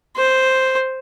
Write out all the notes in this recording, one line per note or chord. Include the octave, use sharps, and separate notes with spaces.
C5